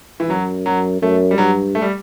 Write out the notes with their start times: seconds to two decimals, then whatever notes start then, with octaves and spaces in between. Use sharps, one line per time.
0.20 E3
0.29 F#2 F#3
0.66 F#3
1.02 F#2 A3
1.31 G3
1.38 G2 F#3
1.75 A3
1.82 G3